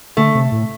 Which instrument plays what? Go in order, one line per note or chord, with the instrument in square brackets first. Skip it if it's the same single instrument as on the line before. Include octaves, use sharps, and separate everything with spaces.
[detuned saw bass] D3 [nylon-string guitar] A3
[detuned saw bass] C3
A2